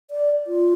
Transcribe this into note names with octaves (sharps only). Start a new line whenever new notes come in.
D5
F4